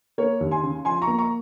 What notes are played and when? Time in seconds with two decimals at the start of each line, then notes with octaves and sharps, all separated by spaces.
0.18 A#3 A#4 C#5
0.41 D#2
0.51 G#5 C6
0.63 C#3
0.85 F3 G#5 C6
1.02 A#5 C#6
1.07 A#3
1.18 A#5 C#6